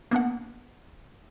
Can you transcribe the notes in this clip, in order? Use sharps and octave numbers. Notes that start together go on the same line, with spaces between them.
A#3 B3 D4 F#5